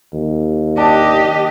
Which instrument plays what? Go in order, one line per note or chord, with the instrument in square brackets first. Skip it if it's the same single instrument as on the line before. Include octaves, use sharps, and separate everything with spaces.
[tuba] D#2
[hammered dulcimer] D4 [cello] G4 D#5